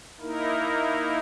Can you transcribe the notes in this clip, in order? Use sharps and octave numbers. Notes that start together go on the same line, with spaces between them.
A#3 D#4 E4 A#4